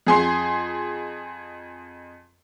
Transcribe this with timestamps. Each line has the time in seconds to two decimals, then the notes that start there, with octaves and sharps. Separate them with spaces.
0.07 F2 G#4 C6 C7